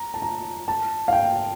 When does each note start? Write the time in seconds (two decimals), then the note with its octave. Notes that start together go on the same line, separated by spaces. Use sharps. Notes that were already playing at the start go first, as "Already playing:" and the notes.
Already playing: A#5
0.14 A5
0.22 A#5
0.68 A5
1.08 F5
1.13 G5